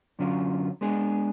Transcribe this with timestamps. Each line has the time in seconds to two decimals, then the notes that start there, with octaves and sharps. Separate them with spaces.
0.19 F#2 D3 F#3 C#4 F4
0.81 G#3 B3 D4 G#4